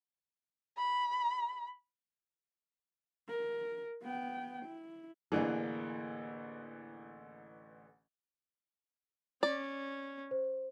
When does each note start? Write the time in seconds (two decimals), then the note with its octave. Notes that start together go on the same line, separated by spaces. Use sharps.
0.77 B5
3.29 A#4
4.02 B3 G5
4.66 E4
5.32 A1 D3 E3 A#3 D4 G#4
9.43 C#4 D5
10.31 C5